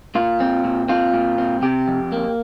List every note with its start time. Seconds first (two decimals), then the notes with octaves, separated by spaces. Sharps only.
0.15 A#2 F4
0.40 C4
0.64 A#2
0.89 C4 F4
1.13 A#2
1.38 C4
1.62 C3 G4
1.88 F2
2.12 A#3